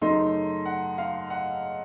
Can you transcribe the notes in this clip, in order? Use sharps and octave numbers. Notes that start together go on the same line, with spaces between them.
F#2 C#3 A3 D#4 C6
F#5
F5
F#5